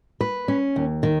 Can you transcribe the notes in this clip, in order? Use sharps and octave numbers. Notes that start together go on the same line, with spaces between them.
B4
C#4
D#2
D#3